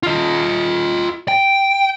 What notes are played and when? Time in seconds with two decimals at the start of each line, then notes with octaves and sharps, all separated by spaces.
0.03 F4 D#5
1.28 G5